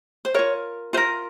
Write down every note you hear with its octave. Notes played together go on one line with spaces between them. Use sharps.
C5
F4 A#4 C#5
F4 A#4 C5